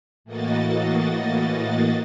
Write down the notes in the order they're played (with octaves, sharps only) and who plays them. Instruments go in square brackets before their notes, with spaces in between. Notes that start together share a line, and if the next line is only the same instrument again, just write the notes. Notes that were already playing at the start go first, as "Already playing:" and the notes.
[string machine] A2 E3 A#3 F#4 D#5 A6